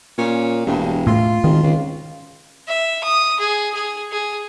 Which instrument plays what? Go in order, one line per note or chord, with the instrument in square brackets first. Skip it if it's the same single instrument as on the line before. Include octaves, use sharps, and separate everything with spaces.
[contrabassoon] A#2 [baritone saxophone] C#4
[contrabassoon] E1 [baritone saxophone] G2
[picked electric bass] A2 [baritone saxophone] F4
[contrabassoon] G#1 [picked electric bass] D#3
[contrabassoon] C#2
[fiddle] E5
D#6
G#4
G#4
G#4